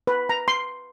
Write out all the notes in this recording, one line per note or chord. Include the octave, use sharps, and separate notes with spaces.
B4
A#5
C6